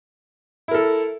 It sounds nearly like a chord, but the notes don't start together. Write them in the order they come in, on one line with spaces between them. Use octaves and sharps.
E4 A#4 A4